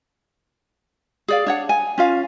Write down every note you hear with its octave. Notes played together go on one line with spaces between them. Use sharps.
G#4 D5 F5
D4 C#5 F#5
G#5
C#4 F4 F5 G#5